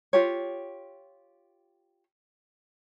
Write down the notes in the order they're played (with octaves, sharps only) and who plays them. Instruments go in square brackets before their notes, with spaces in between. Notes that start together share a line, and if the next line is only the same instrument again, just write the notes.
[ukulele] F4 G4 C#5